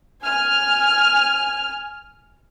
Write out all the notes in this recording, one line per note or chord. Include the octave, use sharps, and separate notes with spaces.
G#5 F6